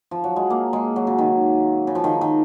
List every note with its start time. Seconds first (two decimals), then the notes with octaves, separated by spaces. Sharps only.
0.11 F3
0.24 F#3
0.36 G#3
0.50 A#3
0.73 G#3
0.96 F#3
1.07 C#3
1.18 D#3
1.87 C#3
1.95 F3
2.04 D#3
2.21 D#3